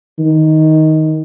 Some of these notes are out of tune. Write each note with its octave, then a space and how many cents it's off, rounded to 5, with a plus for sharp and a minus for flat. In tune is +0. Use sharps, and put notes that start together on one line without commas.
D#3 +10